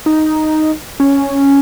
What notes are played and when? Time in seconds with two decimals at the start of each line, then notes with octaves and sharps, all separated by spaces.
0.06 D#4
1.00 C#4